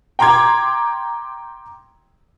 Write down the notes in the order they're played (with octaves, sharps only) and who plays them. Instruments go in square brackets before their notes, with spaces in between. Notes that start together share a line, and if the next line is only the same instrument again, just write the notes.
[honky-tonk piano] G5 A#5 C6 D6 G#6